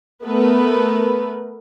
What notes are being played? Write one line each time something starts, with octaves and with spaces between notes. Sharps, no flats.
A3 B3 A#4 B4